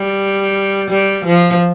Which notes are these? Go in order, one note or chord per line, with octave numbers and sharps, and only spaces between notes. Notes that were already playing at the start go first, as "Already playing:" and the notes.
Already playing: G3
G3
F3